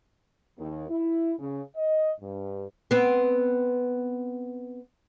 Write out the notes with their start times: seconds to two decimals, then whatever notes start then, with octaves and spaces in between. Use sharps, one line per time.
0.58 D#2
0.89 E4
1.39 C#3
1.76 D#5
2.20 G2
2.91 B3 C4